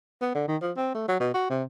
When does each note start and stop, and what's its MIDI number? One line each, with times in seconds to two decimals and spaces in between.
0.22 0.32 59
0.35 0.44 50
0.48 0.56 51
0.62 0.72 53
0.77 0.94 60
0.95 1.07 57
1.08 1.16 54
1.20 1.33 47
1.34 1.48 66
1.50 1.63 48